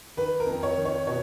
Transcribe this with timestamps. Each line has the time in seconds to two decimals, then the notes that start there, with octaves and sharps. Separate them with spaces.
0.17 D#3 B4
0.40 A#4
0.47 F2
0.63 C#5
0.78 D#3
0.85 C#5
1.07 B2 C#5